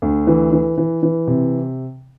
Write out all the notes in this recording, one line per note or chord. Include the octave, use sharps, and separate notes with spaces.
D2
E3
E3
E3
E3
C3